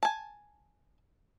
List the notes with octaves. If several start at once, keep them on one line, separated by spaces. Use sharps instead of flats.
G#5 A5